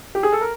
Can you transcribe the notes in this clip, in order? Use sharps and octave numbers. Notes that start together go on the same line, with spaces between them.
G4
G#4
A4
A#4